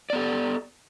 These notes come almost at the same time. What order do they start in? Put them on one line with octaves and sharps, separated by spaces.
D5 B3 A4